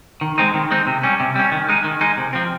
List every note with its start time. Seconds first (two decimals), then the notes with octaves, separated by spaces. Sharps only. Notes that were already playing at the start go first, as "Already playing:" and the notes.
0.21 D#3
0.38 G#3 C4 D#4
0.54 D#3
0.71 G#3 C4 D#4
0.87 C3
1.03 G3 C#4
1.20 C3
1.36 G3 C#4
1.52 D#3
1.69 G#3 D#4
1.84 D#3
2.01 G#3 D#4
2.17 C3
2.33 F3 C4